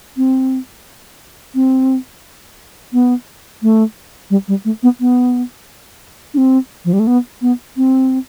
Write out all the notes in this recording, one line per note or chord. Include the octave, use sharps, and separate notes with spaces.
C4
C4
B3
A3
G3
G3
A3
B3
B3
D4
C4
F3
G3
A3
B3
B3
C4